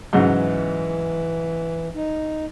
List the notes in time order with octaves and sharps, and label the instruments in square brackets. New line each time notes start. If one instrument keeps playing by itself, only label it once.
[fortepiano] G#2 C#3 F#3 [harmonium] E3
[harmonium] D#4